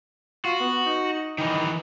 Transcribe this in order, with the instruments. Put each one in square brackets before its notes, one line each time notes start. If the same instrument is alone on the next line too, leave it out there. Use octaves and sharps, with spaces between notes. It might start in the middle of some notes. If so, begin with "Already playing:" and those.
[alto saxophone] F4 [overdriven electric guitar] F#4
[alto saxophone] B3
D#4
[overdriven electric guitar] D#3 E3 [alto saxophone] D#4